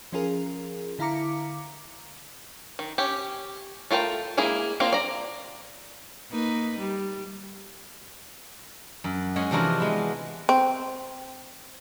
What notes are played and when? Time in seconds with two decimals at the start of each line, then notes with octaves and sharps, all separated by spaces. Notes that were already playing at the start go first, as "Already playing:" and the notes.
0.12 F3 C#4 F4 G#4 A#4
0.99 D3 E4 F5 A#5 D6 C#7
2.79 D#3
2.98 C#4 G4
3.91 A3 F4 A#4 G5 A5
4.37 G#3 A#3 E4 G#4
4.80 A#3 C4 D4 F4
4.93 D5 A#5
6.30 A#3 D#4 B4
6.78 G3
9.04 F#2
9.36 G#3 C#4 G#4 F#5
9.51 C3 E3 F3 D4 F#4 A#4
9.80 G#3 B3
10.49 C4